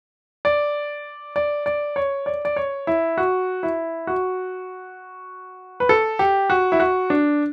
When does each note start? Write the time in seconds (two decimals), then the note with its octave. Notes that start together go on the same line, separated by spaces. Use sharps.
0.45 D5
1.36 D5
1.66 D5
1.96 C#5
2.26 D5
2.45 D5
2.56 C#5
2.87 E4
3.18 F#4
3.63 E4
4.07 F#4
5.80 B4
5.89 A4
6.19 G4
6.50 F#4
6.72 E4
6.80 F#4
7.10 D4